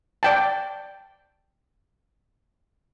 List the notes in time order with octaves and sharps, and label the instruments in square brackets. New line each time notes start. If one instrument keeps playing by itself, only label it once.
[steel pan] D5 G5 A5